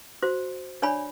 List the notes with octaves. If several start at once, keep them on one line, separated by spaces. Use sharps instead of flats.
F#4 C5
D4 C#5 D5 G#5 B5